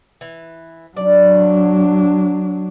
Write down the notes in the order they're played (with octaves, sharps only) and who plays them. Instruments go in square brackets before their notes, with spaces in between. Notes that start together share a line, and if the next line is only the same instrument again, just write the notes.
[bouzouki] E3
[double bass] F#3 D4 [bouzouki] D5